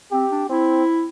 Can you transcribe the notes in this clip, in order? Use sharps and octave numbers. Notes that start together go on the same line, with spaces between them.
C4 G4
D4
C4 E4